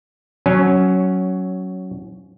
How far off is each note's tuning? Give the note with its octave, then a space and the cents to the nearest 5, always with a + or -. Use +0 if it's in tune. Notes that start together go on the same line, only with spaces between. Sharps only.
F#3 +10 C#4 +0